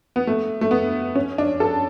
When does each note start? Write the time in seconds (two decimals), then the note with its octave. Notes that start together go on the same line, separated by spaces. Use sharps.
0.16 B3
0.27 A3
0.61 A3
0.71 B3
1.16 C#4
1.38 D4
1.60 A4